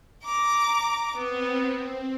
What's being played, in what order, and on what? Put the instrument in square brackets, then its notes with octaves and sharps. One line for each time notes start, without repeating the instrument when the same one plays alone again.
[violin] A#5 D6
[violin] B3 [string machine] C4